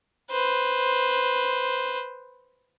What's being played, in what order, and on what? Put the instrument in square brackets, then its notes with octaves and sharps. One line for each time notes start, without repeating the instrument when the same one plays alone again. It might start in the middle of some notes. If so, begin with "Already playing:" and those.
[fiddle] B4 C5